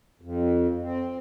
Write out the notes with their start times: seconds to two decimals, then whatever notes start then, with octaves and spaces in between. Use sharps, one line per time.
0.22 F2
0.83 C4